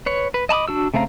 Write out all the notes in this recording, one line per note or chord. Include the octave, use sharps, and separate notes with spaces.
B4 C#5
B4
D#5 A5 B5 D6 D#6
D4 F#4 E6
C#3 A3 C4 F5 A#5